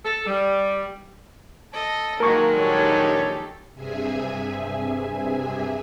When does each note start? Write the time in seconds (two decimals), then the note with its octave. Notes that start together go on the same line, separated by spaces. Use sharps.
0.03 A4
0.26 G3
1.74 A4 D#5
2.20 D#3 F#3 G#3 A#3 A#4 C#6
2.55 A#1 G3 D#4 G4 A4 C#5
3.75 G2 C3 G#4 E5 G#5